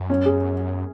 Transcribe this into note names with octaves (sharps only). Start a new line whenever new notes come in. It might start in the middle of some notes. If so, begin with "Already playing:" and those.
Already playing: F#2
C#4
G#4